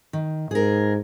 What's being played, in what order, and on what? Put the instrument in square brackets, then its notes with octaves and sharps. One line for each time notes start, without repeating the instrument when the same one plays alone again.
[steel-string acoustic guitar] D#3
[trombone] G#2 [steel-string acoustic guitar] G#4 A#4